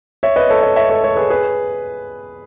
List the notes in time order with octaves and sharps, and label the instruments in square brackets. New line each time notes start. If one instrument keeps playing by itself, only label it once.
[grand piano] C#5 E5
B4 D#5
A4 C#5
B4 D#5
C#5 E5
A4 C#5
A4 C#5
G#4 B4
G#4 B4